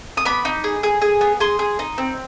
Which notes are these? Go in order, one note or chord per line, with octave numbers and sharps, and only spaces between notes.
D#6
B3 B5 D6
D#4
G#4
G#4
G#4
B3
G#4 C6 D#6
G#4
D#4
C4